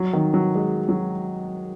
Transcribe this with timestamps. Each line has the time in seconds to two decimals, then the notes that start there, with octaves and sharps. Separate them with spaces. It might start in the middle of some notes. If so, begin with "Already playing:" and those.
Already playing: F#3
0.13 D#3
0.34 F#3
0.55 G#3
0.89 F#3